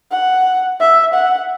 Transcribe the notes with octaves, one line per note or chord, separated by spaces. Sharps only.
F#5
E5
F#5